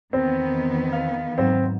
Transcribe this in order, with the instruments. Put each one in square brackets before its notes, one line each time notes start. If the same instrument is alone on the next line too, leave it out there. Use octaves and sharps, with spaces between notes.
[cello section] E2 D#3 B3 [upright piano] C4
[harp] F5
[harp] G#2 F#3 E7 [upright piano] C4